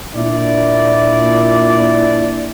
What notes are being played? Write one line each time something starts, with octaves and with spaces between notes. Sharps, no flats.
A#2 D4 E4 D5